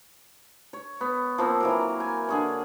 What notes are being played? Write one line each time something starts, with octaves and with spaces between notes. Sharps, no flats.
C#5
B3
F3 A#3 C4
E3 F#3 A#4
G#5
D3 G#4 C#5